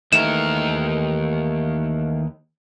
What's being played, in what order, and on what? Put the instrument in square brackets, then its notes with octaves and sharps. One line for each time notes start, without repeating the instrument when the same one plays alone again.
[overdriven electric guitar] D#2 A#4 [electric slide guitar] D#3 E3 A3 [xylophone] E7